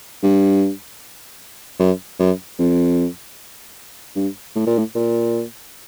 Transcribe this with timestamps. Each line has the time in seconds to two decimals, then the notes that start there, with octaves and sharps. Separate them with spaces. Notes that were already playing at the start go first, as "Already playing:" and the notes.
0.23 G2
1.80 F#2
2.20 F#2
2.59 F2
4.16 G2
4.56 A2
4.67 A#2
4.78 A2
4.95 A#2